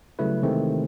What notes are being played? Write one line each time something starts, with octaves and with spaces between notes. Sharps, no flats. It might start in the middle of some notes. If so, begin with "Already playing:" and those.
C#3 F#3 G3 A3 E4 B4
C3 D#3 E3 G#3 A3 C4